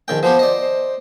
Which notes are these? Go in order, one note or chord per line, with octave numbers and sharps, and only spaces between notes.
A#1 D#3 G5
F3 B3 G4 C5
D5 D#5
C5